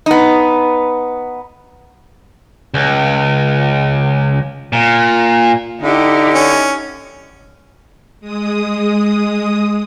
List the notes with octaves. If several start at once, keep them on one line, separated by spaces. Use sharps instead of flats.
B3 D#4
C#2
A#2
D3 D#4 E4 G4
C#4
G#3 D#6